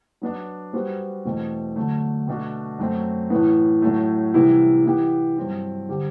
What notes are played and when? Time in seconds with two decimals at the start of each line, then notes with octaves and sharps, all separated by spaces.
0.22 F#3 B3 D4
0.73 G3 B3 F#4 C5
1.25 E2 B2 A3 C4
1.76 D3 F#3 A3
2.28 B2 A3 D4 F#4
2.79 F#2 F#3 A3 C4
3.30 A2 E3 B3
3.82 A2 F#3 A3
4.34 C3 E3 G3 B3 E4
4.85 E3 B3 E4 G4
5.37 G2 F#3 C4 E4
5.89 D3 G3 C4 G4